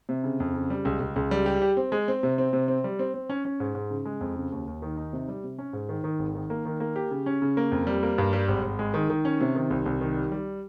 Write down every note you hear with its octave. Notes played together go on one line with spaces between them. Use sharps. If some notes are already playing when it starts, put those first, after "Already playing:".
C3
C#3
F2
C#3
G3
C#2
C#2
C#2
G3
G4
G4
C4
G#3
C4
C3
C4
C3
C4
G3
C4
C4
C#4
C#4
G#2
G#2
C#3
G#3
F2
C#3
D#2
D#2
D#3
D#4
C3
G3
C3
C#4
G#2
D#3
D#3
G#1
D#3
A#3
D#3
A#3
G4
C#3
C#4
C#3
A#3
F2
G3
A#3
G2
G3
G#1
G#1
G#3
D#3
D#3
C#4
C3
D#3
C2
C2
D#3
G3
G3